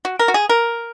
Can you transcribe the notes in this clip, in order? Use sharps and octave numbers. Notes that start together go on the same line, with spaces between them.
F#4
A#4
F#4
G#4
A#4